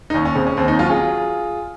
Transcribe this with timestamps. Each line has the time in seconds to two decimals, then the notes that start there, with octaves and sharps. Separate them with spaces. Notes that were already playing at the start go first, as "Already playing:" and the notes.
0.10 D#4
0.14 D#2 C#4
0.25 C#4
0.35 C#3 C4
0.47 C#4
0.57 D#2 C4
0.68 C4 D#4
0.79 F#3 C#4 F4
0.89 F4 G#4